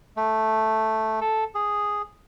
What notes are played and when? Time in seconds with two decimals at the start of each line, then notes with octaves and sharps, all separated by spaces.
0.17 A3
1.21 A4
1.55 G#4